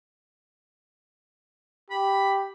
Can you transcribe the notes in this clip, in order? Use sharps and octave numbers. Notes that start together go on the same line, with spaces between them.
G4 B5